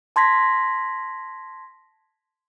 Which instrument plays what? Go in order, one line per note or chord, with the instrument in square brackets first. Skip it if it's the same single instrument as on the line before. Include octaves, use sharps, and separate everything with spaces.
[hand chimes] A5 C6 G#6 A#6 B6